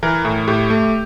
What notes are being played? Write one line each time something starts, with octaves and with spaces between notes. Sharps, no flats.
E3 A#4
A2
A2 G4
A3